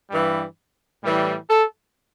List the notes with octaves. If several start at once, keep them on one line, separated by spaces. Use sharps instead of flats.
G2 E3 G3
A2 E3 G3
A4